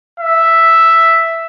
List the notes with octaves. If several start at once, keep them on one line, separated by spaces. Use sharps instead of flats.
E5